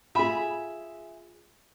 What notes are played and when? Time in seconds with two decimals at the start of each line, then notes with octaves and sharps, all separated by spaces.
0.15 F4 G#4 E5 G#5 B5